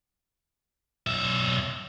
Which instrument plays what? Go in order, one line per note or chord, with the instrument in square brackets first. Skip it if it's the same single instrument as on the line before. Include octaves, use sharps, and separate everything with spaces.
[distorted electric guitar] B1 E5